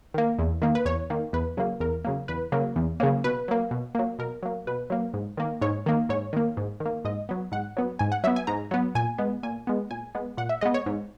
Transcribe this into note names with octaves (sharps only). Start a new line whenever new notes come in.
D#3 A#3
E2
D#3 A#3
B4
E2 C#5
D#3 A#3
E2 B4
C#3 F#3 A#3
E2 A#4
C#3 F#3 A#3
E2 B4
C#3 F#3 A#3
E2
C#3 F#3 A#3
B2 B4
F#3 A#3
B2
F#3 A#3
B2 A#4
F#3 A#3
B2 B4
F#3 A#3
G#2
D#3 A#3
G#2 C#5
D#3 A#3
G#2 C#5
D#3 A#3
G#2
D#3
A#3
G#2 D#5
F#3 B3
G#2 F#5
F#3 B3
G#2 G#5
F#5
F#3 B3 E5
G#5
G#2 A#5
F#3 B3
A#2 G#5
G#3 B3
A#2 G#5
G#3 B3
A#2 G#5
G#3 B3
A#2 F#5
E5
G#3 B3 D#5
C#5
G#2